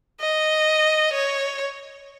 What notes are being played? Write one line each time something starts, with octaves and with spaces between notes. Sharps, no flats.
D#5
C#5